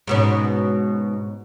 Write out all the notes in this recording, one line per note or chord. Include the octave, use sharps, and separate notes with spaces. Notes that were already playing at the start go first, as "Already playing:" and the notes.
G#2 B2 C#4